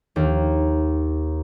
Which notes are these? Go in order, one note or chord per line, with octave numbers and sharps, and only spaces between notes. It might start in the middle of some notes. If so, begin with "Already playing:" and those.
D#2